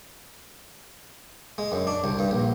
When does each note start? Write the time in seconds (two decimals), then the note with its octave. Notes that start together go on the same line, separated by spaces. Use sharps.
1.58 G#3
1.72 F#2
1.87 D4
2.04 C2
2.19 G2
2.31 A#1